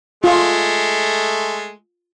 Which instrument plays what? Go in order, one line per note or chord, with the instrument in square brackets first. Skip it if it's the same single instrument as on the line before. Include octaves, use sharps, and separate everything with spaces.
[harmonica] G#3 A3 [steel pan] F4